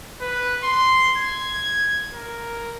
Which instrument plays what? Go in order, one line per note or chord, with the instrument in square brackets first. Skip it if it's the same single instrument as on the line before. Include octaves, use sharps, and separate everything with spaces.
[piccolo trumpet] B4
C6
G#6
A#4